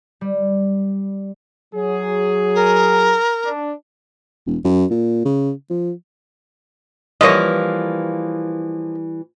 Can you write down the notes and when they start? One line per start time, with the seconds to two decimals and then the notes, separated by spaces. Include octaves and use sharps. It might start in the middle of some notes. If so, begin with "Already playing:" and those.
0.21 G3
1.74 F#3 G#4
2.55 A#4
3.45 D4
4.47 E1
4.65 F#2
4.90 A#2
5.25 C#3
5.70 F3
7.21 E3 F3 G3 A#3 C#5 D#5